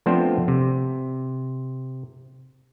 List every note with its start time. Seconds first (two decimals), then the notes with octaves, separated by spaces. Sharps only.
0.06 F3 A3 B3 C4 D4 C5
0.48 C3